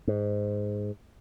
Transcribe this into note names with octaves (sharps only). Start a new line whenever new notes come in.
G#2